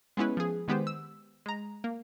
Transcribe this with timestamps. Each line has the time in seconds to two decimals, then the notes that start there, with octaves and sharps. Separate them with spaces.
0.17 G#3 B3 C#4 E4 B4
0.37 F3 G#4
0.68 D#3 G#3 B3 G4 C5
0.87 E6
1.46 G#3 A#5
1.84 A#3